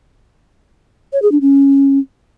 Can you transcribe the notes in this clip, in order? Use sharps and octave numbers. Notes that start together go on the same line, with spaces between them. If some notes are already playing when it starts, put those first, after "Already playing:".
C#5
G#4
D4
C#4